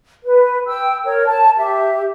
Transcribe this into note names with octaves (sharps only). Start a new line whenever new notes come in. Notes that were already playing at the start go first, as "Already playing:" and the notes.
B4
G5 E6
A#4 C#5
A5
G4 E5